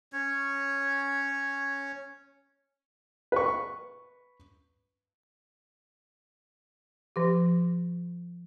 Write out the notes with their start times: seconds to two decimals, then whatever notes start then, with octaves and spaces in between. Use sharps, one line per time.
0.13 C#4 C#5
3.32 B4 C#6
7.16 F3 G4